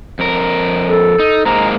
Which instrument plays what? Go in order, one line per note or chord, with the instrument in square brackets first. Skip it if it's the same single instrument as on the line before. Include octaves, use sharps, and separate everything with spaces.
[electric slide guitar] F2 A#4
[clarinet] A4
[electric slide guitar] D#4
[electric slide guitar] G#2 G#3 A#3 [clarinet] A#5